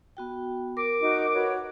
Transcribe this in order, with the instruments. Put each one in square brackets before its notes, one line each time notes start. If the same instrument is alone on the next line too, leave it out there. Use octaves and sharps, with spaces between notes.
[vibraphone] B3 F#4 G5
[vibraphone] A#4 [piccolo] D6
[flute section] D#4 F#4 D#5
F#4 B4 C#5